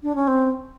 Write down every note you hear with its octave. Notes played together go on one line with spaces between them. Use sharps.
D4
C#4
C4